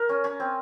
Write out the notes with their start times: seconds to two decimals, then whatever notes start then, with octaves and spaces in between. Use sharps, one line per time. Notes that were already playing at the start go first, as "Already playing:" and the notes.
Already playing: A#4
0.09 C#4
0.24 C#4
0.40 C4